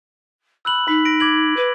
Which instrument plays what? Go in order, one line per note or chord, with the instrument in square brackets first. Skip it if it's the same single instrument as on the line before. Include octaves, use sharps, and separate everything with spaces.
[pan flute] B5 [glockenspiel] E6 F#6 F#7
[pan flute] D#4 [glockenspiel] B5 B6
[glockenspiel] A#6 D7
D6 G#6 F#7
[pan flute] B4